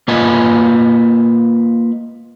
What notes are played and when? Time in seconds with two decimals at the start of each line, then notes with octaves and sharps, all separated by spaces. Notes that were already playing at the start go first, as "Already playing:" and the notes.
0.08 A#3 F4 B4 D#5 G#5